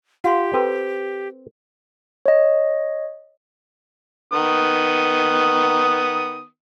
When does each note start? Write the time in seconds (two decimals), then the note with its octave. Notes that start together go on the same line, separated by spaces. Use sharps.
0.24 F4 G4 F#5 C6
0.53 C4 F4 A4 B4
2.26 C#5 D#5
4.33 D#3 B3 D#6